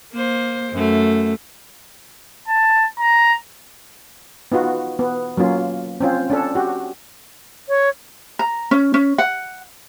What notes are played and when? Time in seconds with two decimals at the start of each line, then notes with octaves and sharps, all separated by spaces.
0.13 A#3 C5
0.72 F#2 A3
2.48 A5
3.00 A#5
4.52 B3 D#4 F4 F#4
4.99 B3
5.37 F#3 A#3 C#4 F4
6.00 C4 C#4 F4
6.30 C#4 D4 A4
6.55 F#4 G4
7.69 C#5
8.39 A#5
8.71 C#4
8.94 C#4
9.18 F#5